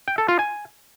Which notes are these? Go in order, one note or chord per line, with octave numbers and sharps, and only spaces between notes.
G5
A4
F4
G#5